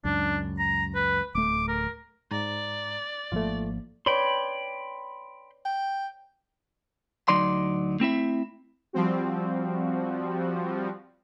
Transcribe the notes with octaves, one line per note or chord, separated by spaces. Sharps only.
C#2 F#2 D4
A#5
B4
D1 A3 D6
A#4
G#2 D5 A#5
G#1 F3 A3 A#3 F4
B4 C#5 D5 G5 B5 C6
G5
D2 F#3 D#4 D5 C6
A3 C4 E4 E5
F3 G3 C4 F#4